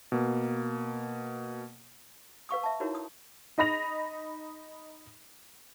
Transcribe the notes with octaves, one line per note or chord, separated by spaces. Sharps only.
B2 A#3
B4 F5 C#6 D#6
E5 A5
D#4 E4 F#4 A#4 C#5
D#6
D#4 D#5 B5 A#6 F7